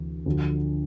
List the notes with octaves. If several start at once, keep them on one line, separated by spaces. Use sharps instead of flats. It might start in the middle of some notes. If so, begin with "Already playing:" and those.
Already playing: D2 C3 E3
D2 D3 F3